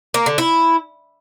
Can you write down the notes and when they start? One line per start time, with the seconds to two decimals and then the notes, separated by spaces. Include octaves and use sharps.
0.14 A#3
0.26 D3
0.38 E4